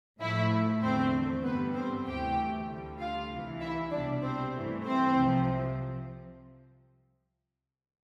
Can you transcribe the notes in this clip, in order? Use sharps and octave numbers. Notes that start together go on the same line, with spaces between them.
A2 F3 A3 E4 E5
E2 D3 A3 C4 C5
G2 D3 G3 B3 B4
C4 C5
D2 C3 E3 A3 G4 G5
D2 D3 G3
F4 F5
C2 C3 E3
E4 E5
C2 B2 G3 D4 D5
C4 C5
G2 E3 A3
C4 C5
C2 C3 F3